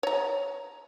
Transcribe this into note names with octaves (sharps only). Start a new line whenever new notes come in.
C#5 A#5